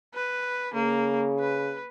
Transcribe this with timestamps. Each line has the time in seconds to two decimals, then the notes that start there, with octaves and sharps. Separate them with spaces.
0.15 B4
0.74 C#3 A#3
1.40 B4